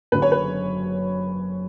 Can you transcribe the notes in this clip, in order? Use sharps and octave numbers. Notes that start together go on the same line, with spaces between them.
F#1 F#2 D3 B4
C#5
B4